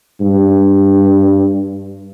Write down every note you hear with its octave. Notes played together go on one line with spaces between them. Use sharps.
G2